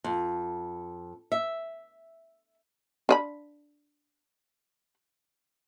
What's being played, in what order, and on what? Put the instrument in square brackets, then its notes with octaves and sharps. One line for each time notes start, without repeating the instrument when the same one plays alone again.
[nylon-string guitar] F2
E5
[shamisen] D4 D#5 B5